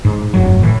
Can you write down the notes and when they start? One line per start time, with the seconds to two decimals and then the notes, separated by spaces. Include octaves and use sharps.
0.05 G#2
0.34 F1 G2 F#3
0.59 A2 E3